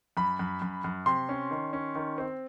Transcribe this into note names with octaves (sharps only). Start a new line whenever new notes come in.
F#2 B5
F#2
F#2
F#2
C3 C6
C#4
D#3
C#4
D#3
C4